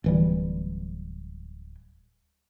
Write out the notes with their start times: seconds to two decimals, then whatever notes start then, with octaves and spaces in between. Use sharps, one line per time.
0.04 D1 E3 G3